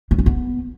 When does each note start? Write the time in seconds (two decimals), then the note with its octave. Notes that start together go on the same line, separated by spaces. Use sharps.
0.11 A#3
0.18 C#4
0.26 B3